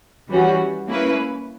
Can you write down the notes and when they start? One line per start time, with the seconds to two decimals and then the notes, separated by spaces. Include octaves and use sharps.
0.28 E3 G3 C#4 F#4
0.87 A#3 C#4 E4 B4